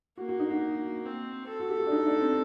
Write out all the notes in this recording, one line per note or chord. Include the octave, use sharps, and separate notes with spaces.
A#3 F#4
F#4
D#4
F#4
C4
A4
F#4
G4
F#4
D4
D#4
D4
C4